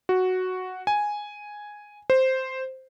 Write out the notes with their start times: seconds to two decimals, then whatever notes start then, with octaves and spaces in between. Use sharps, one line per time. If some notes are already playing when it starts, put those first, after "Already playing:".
0.09 F#4
0.87 G#5
2.10 C5